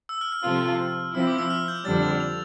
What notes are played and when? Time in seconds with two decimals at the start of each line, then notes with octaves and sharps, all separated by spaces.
0.09 E6
0.21 F6
0.32 F6
0.44 C3 F3 C4 F4 A4 F6
1.14 F3 C4 E4 E6
1.27 D6
1.38 E6
1.50 F6
1.68 G6
1.85 F2 D3 G3 D4 A6
2.03 F7
2.20 F7